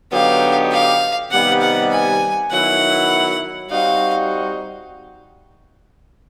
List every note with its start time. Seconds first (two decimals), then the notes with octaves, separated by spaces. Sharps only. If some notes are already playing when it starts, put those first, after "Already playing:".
0.12 D3 F#3 B3 D#4 G4 F5
0.72 F5
1.31 C3 D#3 G3 B3 D#4 F#5
1.62 F#5
1.91 G#5
2.51 D#3 F#3 B3 E4 F#5
3.70 G3 C4 D#4 F#4 F5